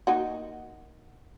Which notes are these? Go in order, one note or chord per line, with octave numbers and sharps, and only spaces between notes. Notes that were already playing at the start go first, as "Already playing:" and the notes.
A#3 D#4 F#4